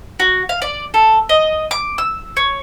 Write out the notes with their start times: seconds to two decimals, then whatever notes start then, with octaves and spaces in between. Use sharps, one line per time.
0.20 F#4
0.49 F5
0.62 D5
0.94 A4
1.29 D#5
1.71 D6
1.98 E6
2.37 C#5